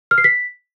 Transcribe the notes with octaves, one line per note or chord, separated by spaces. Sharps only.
F6
C7
B6